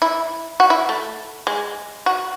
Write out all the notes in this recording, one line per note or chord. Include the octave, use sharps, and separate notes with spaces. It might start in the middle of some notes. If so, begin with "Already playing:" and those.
E4
F#4
E4
A3
G#3
F#4